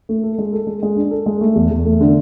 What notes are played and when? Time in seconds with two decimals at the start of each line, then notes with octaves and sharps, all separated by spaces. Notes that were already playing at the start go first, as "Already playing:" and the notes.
0.09 A3
0.24 A4
0.38 G#3
0.53 A4
0.67 G#3
0.83 G#3
0.96 D4
1.11 A4
1.26 G#3
1.41 A3
1.56 E2
1.70 E2
1.86 A3
2.01 D3